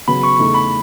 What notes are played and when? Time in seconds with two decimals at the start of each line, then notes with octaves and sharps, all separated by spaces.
0.08 C#3 F#3 B3 B5
0.23 C#6
0.39 E2 C#3 E3 A3 D#4
0.55 B5